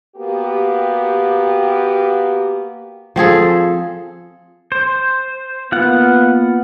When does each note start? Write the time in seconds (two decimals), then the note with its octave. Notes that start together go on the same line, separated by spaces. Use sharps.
0.16 A#3 B3 F#4 G4
3.16 F3 C4 G#4 A4
4.72 C5
5.72 A#3 B3 F4 F#5